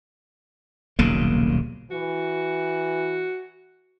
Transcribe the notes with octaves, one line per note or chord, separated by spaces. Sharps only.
D#1 B1 C#3 A#3
E3 F#4